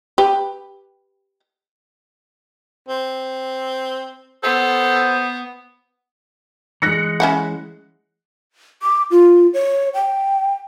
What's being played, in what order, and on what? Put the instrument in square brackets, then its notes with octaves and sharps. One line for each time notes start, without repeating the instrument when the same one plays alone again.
[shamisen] G4 B4
[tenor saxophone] C4
[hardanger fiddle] B3 [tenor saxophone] A4 [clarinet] C5
[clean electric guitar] E3 G#3 [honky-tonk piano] F#6 A#6 C#7
[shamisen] C#4 E4 F#5
[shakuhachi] D6
F4
C#5
G5